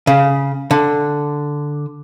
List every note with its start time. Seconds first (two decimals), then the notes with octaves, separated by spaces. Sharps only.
0.07 C#3
0.71 D3